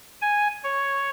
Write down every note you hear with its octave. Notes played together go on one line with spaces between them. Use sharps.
G#5
C#5